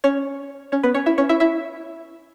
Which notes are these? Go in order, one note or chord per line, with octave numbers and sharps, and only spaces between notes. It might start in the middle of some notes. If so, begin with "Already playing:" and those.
C#4 C#5
C#4 C#5
B3 B4
C#4 C#5
E4 E5
C#4 C#5
E4 E5
E4 E5